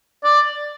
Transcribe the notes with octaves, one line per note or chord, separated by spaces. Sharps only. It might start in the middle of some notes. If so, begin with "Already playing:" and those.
D5